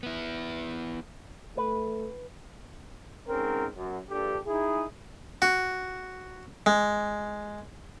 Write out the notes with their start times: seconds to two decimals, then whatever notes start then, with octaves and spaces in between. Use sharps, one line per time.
0.03 B3 E4
1.57 A3 B4
3.28 G#2 C4 C#4 A#4
3.76 F#2
4.10 A#1 G2 D4 G4 A4
4.47 D#4 E4 G#4
5.42 F#4
6.66 G#3